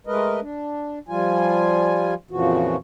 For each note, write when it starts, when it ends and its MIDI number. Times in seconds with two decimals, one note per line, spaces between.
0.07 0.40 56
0.07 0.40 57
0.07 0.40 70
0.07 0.40 71
0.07 0.40 75
0.41 0.99 62
1.08 2.14 53
1.08 2.14 55
1.08 2.14 65
1.08 2.14 80
2.31 2.76 41
2.31 2.76 46
2.31 2.76 49
2.31 2.76 52
2.31 2.76 53
2.31 2.76 66